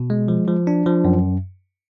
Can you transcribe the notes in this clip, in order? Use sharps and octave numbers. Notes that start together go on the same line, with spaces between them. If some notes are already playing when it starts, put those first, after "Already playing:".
Already playing: B2
G#3
F3
F3
D4
F3
F#2